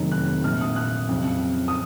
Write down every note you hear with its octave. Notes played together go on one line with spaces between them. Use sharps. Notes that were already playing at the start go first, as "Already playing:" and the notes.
Already playing: F1 D#2 D#3 F#3
F#6
A#1 A#2 F3 F6
D#6
F#6
F2 C#3 F#3
D#6